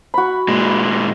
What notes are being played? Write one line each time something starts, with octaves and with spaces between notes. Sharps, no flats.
F#4 B5
A#2 G#3